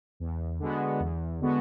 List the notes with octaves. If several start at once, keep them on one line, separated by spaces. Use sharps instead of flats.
E2
D3 G#3 B3 F#4
E2
D3 G#3 B3 F#4